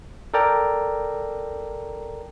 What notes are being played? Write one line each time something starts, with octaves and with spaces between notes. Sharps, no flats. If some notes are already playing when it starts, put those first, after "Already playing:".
A4 A#4 D5 G5 A#5